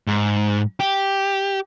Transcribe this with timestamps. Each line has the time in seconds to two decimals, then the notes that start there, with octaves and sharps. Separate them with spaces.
0.07 G#2
0.80 G4